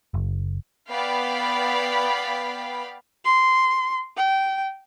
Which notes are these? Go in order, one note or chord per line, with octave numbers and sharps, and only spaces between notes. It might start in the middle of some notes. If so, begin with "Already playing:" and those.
F#1
B3 D5 F5 G5 B5
C6
G5